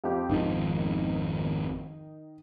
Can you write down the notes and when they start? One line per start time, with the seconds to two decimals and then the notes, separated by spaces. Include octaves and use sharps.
0.04 F2 F4 G4
0.30 G#1 F2 D#3 F3 D#4